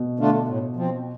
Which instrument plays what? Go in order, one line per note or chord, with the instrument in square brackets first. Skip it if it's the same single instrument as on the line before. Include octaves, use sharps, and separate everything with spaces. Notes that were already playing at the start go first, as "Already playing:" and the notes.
Already playing: [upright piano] B2
[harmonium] D3 A3 D4 F4
A2
F3 C4